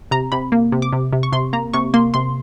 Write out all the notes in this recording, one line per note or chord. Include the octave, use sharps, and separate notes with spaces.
C3 A#5
C3 B5
A#3
C3
D6
C3
C3
C#6
C3 C6
A#3 A#5
C3 C#6
A#3 C6
C3 C6